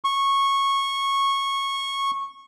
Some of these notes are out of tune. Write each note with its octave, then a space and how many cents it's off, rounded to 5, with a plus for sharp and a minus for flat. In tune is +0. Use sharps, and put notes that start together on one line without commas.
C#6 -15